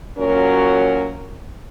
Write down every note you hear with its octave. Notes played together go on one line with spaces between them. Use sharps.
A#2 F#3 C#4 F#4 A#4